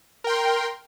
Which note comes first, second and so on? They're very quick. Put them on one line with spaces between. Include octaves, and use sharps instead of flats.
A#4 G5 C6